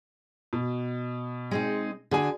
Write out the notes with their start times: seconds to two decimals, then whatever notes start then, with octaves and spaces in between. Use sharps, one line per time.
0.53 B2
1.51 G#3 C4 D#4
2.11 D3 F#4 G#4 G#5